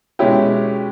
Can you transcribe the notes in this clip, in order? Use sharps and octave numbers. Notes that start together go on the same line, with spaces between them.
B2 G#3 C#4 E4 G4